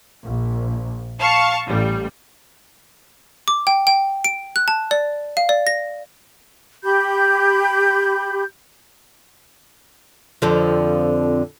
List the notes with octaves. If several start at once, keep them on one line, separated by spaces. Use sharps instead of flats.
A#1
F5 A5 C#6
A1 G3
D6
G5
G5
D7
F#6
A5
D5
F5
D5
A#6
G4 B5 G6
F2 D3 F3